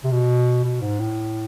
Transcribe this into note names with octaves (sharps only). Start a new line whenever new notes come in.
C3
B2
B2
G#2
A2